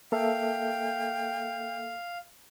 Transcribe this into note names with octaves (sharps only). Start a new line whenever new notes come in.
A#3 A4 E5 F5 G5